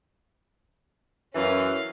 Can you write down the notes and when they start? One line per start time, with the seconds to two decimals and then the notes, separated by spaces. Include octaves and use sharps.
1.34 F#2 E3 C#4 F5